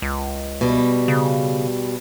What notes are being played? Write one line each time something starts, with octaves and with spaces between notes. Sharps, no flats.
C#2
B2 G3
C#3